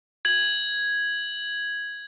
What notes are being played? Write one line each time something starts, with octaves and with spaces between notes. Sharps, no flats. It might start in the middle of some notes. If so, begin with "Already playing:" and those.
G#6 F#7